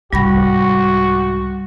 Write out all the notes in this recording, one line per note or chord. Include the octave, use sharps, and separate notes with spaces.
C2 G#2 G3 F#4 B5 A#6